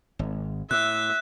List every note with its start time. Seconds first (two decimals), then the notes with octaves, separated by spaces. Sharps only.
0.19 G#1
0.71 A2 E5 F#6